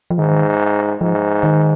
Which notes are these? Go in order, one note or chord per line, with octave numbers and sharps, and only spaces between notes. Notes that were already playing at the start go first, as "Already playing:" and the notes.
F3
G#2 D#3
G#2 F3
D#3